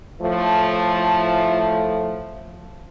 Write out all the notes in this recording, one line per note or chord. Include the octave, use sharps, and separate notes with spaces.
A2 F3 A3